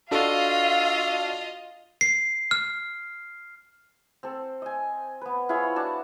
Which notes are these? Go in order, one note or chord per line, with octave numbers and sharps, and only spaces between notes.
D4 F4 F#4 A4 D#5 F5
C7
F6
C4 A4
D#5 G#5
B3 B4
E4 F4 G#4 C#5
D4 F#4 A5